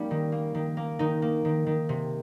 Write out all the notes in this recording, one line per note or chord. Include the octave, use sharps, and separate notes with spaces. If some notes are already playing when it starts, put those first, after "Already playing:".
Already playing: G3 A#3 C#4 D#4
D#3
A#3
D#3
A#3
D#3 D#4
A#3
D#3
D#3
C3